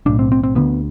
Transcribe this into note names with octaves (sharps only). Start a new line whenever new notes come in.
B1 A2 D4
C4
C4
C4
D2 D3 B3